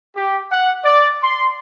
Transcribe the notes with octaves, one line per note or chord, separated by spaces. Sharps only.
G4
F#5
D5
C6